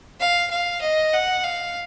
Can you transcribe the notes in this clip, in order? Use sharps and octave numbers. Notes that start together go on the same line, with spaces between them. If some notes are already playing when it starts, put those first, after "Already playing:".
F5
F5
D#5
F#5
F5